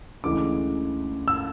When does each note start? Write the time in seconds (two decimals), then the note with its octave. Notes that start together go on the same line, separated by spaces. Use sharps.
0.24 D2 C#3 E3 G#3 D6
1.28 E6